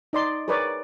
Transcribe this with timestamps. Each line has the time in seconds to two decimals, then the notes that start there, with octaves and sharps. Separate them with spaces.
0.13 D#4 D5 C6
0.48 G#4 A#4 B4 C#5 D5